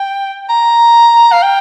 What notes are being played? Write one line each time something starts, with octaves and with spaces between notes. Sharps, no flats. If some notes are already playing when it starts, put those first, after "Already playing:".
Already playing: G5
A#5
F5
G5